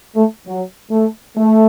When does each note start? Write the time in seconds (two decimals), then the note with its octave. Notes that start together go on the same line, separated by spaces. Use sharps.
0.15 A3
0.46 F#3
0.91 A3
1.37 A3